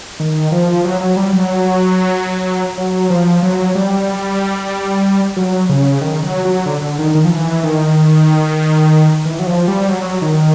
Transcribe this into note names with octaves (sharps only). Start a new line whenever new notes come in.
D#3
F3
F#3
F#3
G3
F#3
F#3
F3
F#3
G3
F#3
C#3
D#3
F#3
F#3
D3
D3
D#3
D#3
F3
E3
D#3
E3
F#3
F3
G3
F#3
D#3